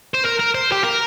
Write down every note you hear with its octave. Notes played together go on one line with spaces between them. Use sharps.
C5
A#4
A#4
C5
G4
A#4